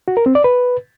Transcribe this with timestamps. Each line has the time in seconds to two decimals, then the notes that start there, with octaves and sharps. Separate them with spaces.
0.08 F#4
0.17 A#4
0.26 C4
0.35 D5
0.44 B4